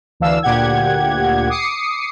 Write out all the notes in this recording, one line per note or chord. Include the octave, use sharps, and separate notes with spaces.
D2 E3 D4 F5 E6
D2 A#2 G4 F#5 G#6
D6 D#6 C7 C#7